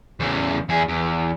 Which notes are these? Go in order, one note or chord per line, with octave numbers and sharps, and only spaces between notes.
E2 C#3
E2 G#4
E2